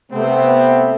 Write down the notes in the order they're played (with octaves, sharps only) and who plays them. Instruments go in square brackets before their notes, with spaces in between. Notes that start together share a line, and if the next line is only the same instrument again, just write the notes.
[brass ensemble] C3 B3 C4 [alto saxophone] A3